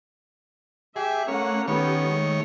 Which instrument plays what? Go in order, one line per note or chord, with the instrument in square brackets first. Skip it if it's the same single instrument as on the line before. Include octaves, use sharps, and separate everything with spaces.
[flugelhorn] G4 [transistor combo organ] G#4 [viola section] E5
[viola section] A3 C#4 F#5 [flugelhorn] A#3 [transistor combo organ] C#5
[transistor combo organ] D#3 C#5 [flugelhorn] B3 [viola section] C#4 G4 A4
[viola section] G#3 A3